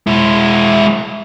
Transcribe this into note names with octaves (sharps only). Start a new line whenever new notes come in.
G#3 E4